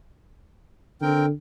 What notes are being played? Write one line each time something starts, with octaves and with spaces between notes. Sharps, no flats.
D3 C4 A#4 G5